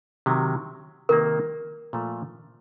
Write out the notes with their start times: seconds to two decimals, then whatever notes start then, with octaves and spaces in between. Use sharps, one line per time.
0.26 C3 D#3 F#3
1.09 C3 D#3 A#3 D#4 A#4
1.93 A#2 F3 A3